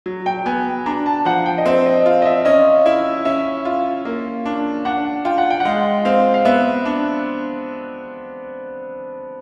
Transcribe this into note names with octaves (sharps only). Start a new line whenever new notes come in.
F#3
G5
B3 G#5
D4 A#5
A5
F3 F#5
G5
D#5
C4 E5
D#5
F4
D#5
E5
C#4 D#5
E4 E5
C#4 E5
F4
A#3
D4
D4 F#5
F4 G5
F#5
G5
F#5
G#3 F5
C4 F5
F5
B3 E5
D4